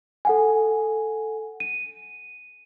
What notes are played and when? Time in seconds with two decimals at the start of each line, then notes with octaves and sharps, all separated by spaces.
0.25 A4 F#5 G#5
1.60 D#7